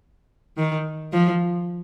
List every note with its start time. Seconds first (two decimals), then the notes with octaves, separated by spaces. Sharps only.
0.57 D#3
1.13 F3